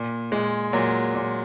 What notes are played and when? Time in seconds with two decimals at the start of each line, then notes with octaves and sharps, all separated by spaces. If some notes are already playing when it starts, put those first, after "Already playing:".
Already playing: A#2
0.32 A#2 G#3
0.73 A#2 F#3
1.15 A#2